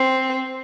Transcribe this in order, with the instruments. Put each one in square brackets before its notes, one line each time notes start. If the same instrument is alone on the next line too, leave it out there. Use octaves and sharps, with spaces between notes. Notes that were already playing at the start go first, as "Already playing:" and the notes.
Already playing: [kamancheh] C4